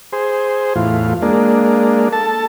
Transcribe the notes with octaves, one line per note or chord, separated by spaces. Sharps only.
G#4 C5
E2 A2 F4
G#3 A#3 D4
A4 A5